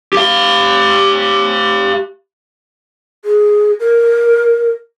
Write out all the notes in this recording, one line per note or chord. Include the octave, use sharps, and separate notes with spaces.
G4 F5
G#4
A#4